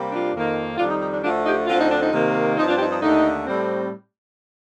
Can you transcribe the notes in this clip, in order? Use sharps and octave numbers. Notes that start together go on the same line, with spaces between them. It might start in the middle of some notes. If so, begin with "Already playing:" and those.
Already playing: C3 G3 A#3
D4 F4
F2 D#3 A#3
F2 D#3 G3 D4 F4
D#4
D#4
D4
D2 D3 F3 A3 D4 F4
D#4 G4
D2 D3 F3 C4 F4
D#4
D4
D#4
C3 D#3 A#3
G2 F3 C4 D#4
D4 F4
D#4 G4
D#4
D#2 D3 A3 D#4
A2 G3 C4